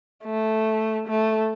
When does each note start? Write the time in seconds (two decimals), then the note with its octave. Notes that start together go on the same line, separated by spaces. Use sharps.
0.24 A3
1.08 A3